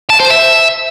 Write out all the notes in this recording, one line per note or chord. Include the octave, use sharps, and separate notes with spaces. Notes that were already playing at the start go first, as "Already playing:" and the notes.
A5
C5
E5